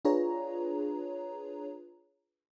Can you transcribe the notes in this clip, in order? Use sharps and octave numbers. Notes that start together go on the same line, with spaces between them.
D4 F4 G#4 B4 C#5 A#5